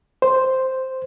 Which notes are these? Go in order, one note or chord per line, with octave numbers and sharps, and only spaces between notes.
C5